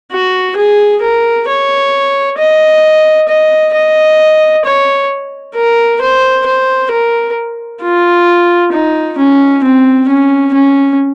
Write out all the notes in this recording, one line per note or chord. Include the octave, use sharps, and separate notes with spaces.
F#4
G#4
A#4
C#5
D#5
D#5
D#5
C#5
A#4
C5
C5
A#4
F4
D#4
C#4
C4
C#4
C#4